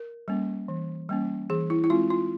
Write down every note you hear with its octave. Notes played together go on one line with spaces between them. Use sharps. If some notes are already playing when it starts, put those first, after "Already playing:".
Already playing: A#4
G3 A#3 C#4
E3
G3 A#3 C#4
E3 G#4
E4
E4
G#3 C4 F4
F4